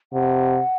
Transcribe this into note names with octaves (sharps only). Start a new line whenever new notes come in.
C3 F#5